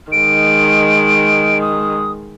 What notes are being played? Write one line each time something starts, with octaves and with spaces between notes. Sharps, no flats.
D#3 G#3 D7
D#6